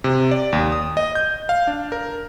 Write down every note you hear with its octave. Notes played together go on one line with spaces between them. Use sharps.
C3
D5
D#2
D#6
D#5
G6
F5
D4
A#4